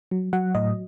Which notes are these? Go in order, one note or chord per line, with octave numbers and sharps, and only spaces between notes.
F#3
F#3 F#5
A2 D#5